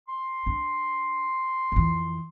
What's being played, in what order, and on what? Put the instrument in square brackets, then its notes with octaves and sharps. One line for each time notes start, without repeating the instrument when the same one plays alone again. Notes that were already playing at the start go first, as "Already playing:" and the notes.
[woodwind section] C6
[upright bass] D4
F2 E3